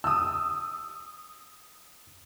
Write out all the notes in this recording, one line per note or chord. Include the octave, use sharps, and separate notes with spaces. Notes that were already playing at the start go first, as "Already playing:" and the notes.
D#6 E6